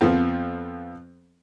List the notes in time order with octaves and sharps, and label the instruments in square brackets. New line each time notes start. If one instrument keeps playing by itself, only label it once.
[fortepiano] F2 F3 B3 C4